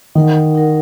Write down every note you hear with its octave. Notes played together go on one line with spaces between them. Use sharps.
D#3 D#4 A#4 F#5
D#4 A#4 F#5